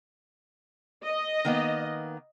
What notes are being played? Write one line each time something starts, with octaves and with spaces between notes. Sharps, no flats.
D#5
D#3 A#3 B3